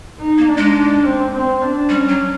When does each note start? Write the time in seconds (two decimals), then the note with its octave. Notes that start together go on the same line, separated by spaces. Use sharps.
0.20 D#4
0.38 A#3
0.48 D4
0.58 G#3
0.77 D4
1.05 C4
1.33 C4
1.61 D4
1.89 G3 C#4
2.09 F#3